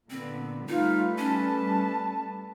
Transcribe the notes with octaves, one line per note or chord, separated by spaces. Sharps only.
A#2 D3 B3 C4
G3 A3 D#4 F4 B4
C#4 A5